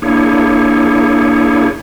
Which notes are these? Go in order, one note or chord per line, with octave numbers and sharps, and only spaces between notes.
A#3 D4 E4 G#4 C#5